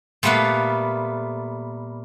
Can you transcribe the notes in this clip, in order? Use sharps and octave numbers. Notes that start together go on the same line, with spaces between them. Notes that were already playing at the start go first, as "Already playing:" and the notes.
A#2 G3 A3 B3 B4 F5